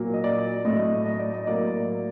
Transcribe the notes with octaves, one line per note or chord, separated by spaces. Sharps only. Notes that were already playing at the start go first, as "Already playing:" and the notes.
Already playing: A#2 F#3 A#3
D#5
D5
A2 F#3 A3 D#5
D#5
D5
D#5
A2 F#3 A#3 D5